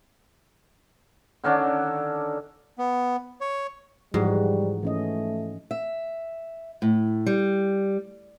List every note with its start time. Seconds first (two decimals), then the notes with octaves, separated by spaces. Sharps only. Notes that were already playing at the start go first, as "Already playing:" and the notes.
1.44 D3 D#3 C#4 D4
2.78 B3
3.41 C#5
4.14 G#2 E3 F3 G3 F#4
4.83 E3 A3 C#4 D#5
5.71 E5
6.82 A2
7.26 G3